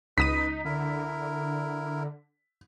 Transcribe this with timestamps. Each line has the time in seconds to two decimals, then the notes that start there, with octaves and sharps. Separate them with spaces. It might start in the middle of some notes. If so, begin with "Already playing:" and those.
0.18 C#2 D#4 B4 D#5 D#6 B6 D#7
0.65 D3 E4 A#4